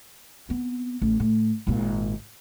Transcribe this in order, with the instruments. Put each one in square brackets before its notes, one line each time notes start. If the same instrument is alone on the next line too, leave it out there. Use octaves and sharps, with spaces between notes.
[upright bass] B3 C4
A1
A2
G#1 A#2